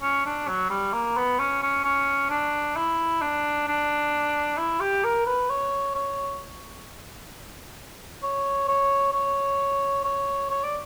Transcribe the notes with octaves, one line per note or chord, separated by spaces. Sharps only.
C#4
D4
F#3
G3
A#3
B3
C#4
C#4
C#4
D4
E4
D4
D4
E4
G4
A#4
B4
C#5
C#5
C#5
C#5
C#5
C#5
C#5
D5